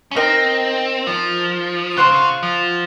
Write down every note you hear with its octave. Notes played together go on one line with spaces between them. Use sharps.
C#4
C4 D#4 A#4 D#5
F3
C#3 F4 C5 F#5
C#3
F3